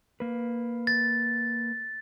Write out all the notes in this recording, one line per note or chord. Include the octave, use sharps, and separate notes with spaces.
A#3 B4
A6